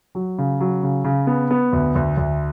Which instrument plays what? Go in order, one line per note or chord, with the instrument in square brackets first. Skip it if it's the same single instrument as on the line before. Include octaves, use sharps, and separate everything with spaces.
[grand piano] F#3
C#3
F#3
C#3
C#3
B3
B3
D2
D2
D2